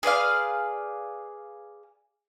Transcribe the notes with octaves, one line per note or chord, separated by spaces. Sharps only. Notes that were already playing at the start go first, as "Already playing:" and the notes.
G#4 B4 D5 F5